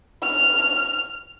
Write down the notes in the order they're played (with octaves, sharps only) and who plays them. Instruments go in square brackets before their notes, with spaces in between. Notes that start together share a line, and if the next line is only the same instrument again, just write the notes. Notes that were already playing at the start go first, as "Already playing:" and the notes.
[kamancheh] F6